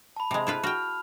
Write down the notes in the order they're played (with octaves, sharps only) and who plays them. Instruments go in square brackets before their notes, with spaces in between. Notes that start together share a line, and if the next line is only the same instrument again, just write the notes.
[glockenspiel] A5 B5
[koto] C3 G#3
E4 F4 B4
[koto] F#4 G5 [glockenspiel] F6 F7